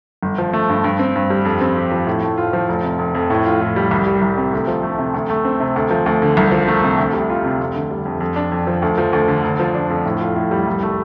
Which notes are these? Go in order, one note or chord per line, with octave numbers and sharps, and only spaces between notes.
G1
F3
A3
G2
G2
C4
G2
G3
F2
C4
G4
F3
A2
A3
F4
F3
F1
C3
F1
F2
A2
F4
A2
G3
C2
G3
C2
C3
D2
F3
A3
C3
D2
A3
C4
C3
D2
F3
D2
D3
C2
F3
A3
C3
D2
G3
F4
C3
F1
D3
G3
F2
F2
D4
F2
F3
D2
F3
D2
D3
F1
F3
D4
F2
A2
F4
A2
G3
C2
A3